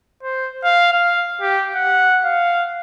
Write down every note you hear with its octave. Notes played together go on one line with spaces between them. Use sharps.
C5
F5
F5
G4
F#5
F5